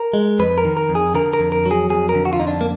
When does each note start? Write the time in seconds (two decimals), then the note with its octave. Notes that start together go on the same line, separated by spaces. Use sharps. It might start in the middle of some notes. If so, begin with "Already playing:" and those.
Already playing: A#4
0.14 G#3
0.39 F2 B4
0.58 A#4
0.65 D#3
0.77 A#4
0.89 F2
0.95 G#4
1.14 D3 A#4
1.34 A#4
1.40 F2
1.52 A#4
1.65 F#3
1.71 G#4
1.90 F2 G#4
2.09 A#4
2.15 D3
2.25 F#4
2.33 F4
2.40 F2 D#4
2.47 D4
2.61 A#3